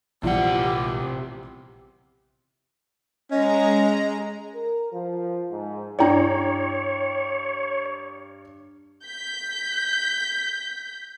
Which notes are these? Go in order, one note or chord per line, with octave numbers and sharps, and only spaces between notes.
A#1 E2 C3 F3 G3 G4 F#5
G#3 C#4 D#5 A#5
A#4
F3
G#2
G2 D4 E4 C#5 D5 G5 A#5
G6 B6